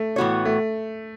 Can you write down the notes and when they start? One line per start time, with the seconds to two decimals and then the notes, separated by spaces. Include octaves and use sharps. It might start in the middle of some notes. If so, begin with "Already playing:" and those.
Already playing: A3
0.16 A2 E3 B3 F#4 C#5
0.45 A3